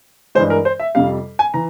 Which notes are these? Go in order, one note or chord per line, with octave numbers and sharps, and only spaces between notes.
G2 E3 G#3 C5
A#4
C5
E5
F2 C3 G3 F5
G#5
E3 A#5